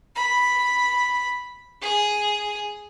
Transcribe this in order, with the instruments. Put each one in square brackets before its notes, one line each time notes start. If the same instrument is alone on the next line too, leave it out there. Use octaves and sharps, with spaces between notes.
[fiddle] B5
G#4